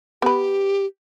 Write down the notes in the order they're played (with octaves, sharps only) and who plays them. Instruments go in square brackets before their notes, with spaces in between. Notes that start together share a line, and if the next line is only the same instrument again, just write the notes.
[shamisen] B3 B4 [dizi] G4